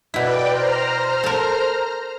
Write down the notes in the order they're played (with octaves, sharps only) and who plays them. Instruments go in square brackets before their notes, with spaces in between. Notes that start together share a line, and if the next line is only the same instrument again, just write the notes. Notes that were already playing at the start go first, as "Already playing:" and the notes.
[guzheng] B2 E4 [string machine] B4 D5 G5
[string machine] C5 A#5 F6
[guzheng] A4 A#4